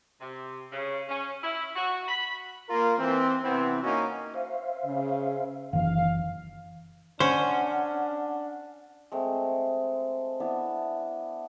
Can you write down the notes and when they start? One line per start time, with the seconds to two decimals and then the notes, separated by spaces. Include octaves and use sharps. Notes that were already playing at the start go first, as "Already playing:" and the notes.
0.20 C3
0.72 C#3
1.09 C#4
1.43 E4
1.76 F#4
2.08 B5
2.69 A#3 F4 A#4
2.99 E3 C4
3.44 C3 E3 B3 C4 E4
3.82 A#3 C#4 D#4 F#4
4.34 C5 E5 F5
4.85 C#3
5.73 F#1 D#3 E3 F5
7.20 C#4 D4 C5 F#5
9.12 G#3 A3 C4
10.40 B3 D4 E4